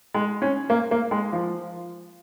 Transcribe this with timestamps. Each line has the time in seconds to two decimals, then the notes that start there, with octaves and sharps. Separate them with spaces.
0.14 G#3
0.42 C#4
0.70 A#3
0.91 A#3
1.11 G#3
1.32 F3